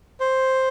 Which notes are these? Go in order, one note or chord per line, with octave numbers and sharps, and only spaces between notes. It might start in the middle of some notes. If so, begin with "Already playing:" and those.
C5